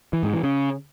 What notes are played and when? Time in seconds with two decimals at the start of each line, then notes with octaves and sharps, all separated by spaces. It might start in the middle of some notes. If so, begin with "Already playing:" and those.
0.13 E3
0.23 G#2
0.33 E3
0.43 C#3